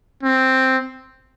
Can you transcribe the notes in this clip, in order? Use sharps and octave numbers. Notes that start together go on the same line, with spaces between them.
C4